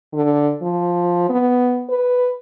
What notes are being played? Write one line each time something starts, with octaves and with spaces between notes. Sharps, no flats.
D3
F3
B3
B4